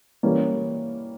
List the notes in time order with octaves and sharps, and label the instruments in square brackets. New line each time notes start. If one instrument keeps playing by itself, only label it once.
[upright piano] E3 G3 A#3 C#4